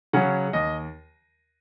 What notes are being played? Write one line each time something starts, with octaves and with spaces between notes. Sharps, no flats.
C#3 F#3 C#4 F#5
D#2 D#5